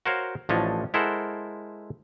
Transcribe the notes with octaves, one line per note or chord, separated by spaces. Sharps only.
F#4 A#4 C5 C#5 F5
A1 A2 F3 D4 C#5 D#5
G#3 E4 A4 A#4 C5 F#5